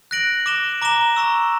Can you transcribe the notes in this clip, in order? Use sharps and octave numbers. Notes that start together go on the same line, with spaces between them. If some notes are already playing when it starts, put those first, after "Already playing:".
F#6 A#6 D7 F#7
D6 A#6 E7 G7
A#5 D6 A#6 E7 G7
A#5 C#6 E6